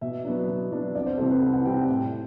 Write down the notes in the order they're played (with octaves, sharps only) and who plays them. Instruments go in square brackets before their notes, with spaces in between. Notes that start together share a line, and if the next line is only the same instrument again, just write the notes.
[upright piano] B2 E5
F#3 B3 D4
B2
F#3 B3 D4
C2 D5
C5
C3 E3 G3 C4 A4
B4
C2 B4
F#5
C3 E3 G3 C4 G5
G5
A2 G5